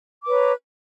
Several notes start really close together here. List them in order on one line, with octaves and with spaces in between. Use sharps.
D6 B4 C#5 A#5